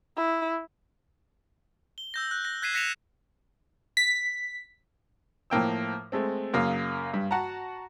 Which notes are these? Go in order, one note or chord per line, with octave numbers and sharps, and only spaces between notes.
E4
G7
E6 G6 A#6
F#6
A#6
F#6 G#6 B6 C7 D#7 E7
F#6 A#6 B6 C#7 E7 F7
B6
A2 F3 A#3 G5 E6
G#3 A3 C4
F#2 C#3 A#3 F5 D#6
G2
F#4 F#5 A5 A#5